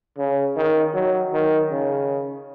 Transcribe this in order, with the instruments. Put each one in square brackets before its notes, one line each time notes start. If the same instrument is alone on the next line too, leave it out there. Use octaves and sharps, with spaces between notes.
[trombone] C#3
D#3
F#3
D#3
C#3